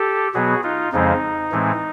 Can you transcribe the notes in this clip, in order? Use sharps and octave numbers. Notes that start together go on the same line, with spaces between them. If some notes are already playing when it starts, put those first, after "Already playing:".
Already playing: G4 A4
B2 F#3 B3 F#4 G#4
D#4 F4
F2 C#3 F3 G#3 C4 D#4
A2 E3 G#3 C4